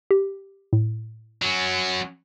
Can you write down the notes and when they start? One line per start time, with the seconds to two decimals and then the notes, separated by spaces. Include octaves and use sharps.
0.11 G4
0.73 A2
1.42 F#3 C#4